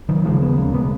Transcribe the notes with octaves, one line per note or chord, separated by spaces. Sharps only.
D#3 F#3
D#2 C#3 F3 G#3
G#3 B3
A#3 C#4
B2 G#3 B3